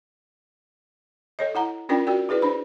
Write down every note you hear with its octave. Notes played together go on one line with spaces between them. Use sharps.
A4 C#5 D#5
E4 F#5 A#5
C#4 D4 F4 A#4 D5 G5
F#4 A#4 D5 G5
E4 G#4 B4 D5
D4 C5 B5